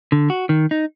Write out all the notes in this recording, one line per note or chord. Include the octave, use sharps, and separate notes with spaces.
D3
F#4
D#3
D#4